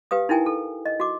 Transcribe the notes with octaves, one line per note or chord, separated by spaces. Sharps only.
G4 B4 F5 D#6
D#4 E4 A#4 G5 G#5
A4
D#5
F#4 D6